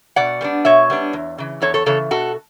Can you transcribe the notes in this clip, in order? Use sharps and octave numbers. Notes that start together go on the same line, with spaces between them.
B2 D5 F#5
G3 B3 D4
B2 C#5 E5
G3 B3 D4
E2
C#3 E3
E2 A4 C#5
A4 C#5
C#3 E3 A4 C#5
B2 F#4 A4